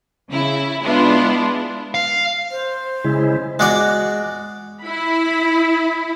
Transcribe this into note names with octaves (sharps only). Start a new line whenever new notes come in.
C#3 E4
G#3 B3 D4 E4 F4
F5
C5
C#3 G#3 E4
G#3 F#4 D5
E4 B5